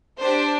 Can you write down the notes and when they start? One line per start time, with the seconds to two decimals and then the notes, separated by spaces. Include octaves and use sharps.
0.20 D4 G4 C5